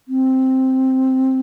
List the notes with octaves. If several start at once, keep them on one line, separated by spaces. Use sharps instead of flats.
C4